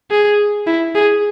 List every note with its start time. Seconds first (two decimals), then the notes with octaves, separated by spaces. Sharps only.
0.11 G#4
0.67 E4
0.95 G#4